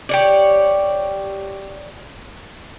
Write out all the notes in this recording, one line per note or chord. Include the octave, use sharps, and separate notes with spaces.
G4 C#5 D5